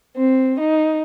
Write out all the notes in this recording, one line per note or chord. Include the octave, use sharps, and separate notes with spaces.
C4
D#4